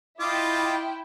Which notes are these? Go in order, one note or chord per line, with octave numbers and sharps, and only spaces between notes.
E4 F4 D#5 G5 D6